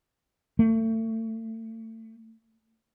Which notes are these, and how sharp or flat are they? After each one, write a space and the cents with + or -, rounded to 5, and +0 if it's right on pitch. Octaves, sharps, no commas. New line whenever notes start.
A3 +30